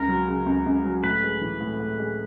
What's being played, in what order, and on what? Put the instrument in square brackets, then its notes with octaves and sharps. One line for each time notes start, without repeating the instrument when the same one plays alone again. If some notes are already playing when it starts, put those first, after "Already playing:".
Already playing: [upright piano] C#2 [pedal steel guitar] A#4
[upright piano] F#3
C#3
C#2
C#2
F#3
[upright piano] A2 [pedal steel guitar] B4
[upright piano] G#3
E3
A2
A2
G#3